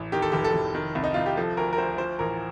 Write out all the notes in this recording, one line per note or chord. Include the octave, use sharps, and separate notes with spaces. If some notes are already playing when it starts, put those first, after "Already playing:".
Already playing: A1
D#3 G4
A4
F1 G4
A4
F1
D#3
C2
D#4
C2 F4
G4
F3 A4
D2 A#4
A#4
D2 C5
F3 C5
A1 A#4